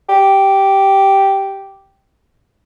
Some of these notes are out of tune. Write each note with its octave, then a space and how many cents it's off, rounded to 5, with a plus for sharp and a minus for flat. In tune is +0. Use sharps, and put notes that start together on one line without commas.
G4 -5